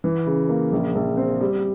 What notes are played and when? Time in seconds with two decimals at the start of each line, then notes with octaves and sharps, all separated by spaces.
0.04 E3
0.26 C#3
0.49 A#3
0.72 A#1
0.95 A#1
1.17 C4
1.41 G3